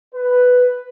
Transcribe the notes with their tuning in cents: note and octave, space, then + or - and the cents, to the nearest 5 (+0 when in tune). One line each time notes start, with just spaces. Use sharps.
B4 +5